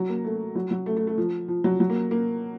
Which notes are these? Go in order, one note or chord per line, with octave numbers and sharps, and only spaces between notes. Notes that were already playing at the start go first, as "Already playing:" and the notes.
Already playing: F#3
A#3
A3
F#3
F#3
A3
A3
A3
F3
F3
F#3
F#3
A#3
A#3